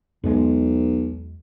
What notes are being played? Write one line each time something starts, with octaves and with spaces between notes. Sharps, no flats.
B1 E2 G#3